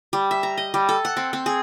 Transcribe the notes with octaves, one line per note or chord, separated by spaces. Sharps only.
G3
E5
A#5
D#5
G3
A4
F#5
C4
C4
G#4